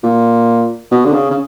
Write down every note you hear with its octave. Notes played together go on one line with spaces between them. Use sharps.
A#2
B2
D3
C#3
C#3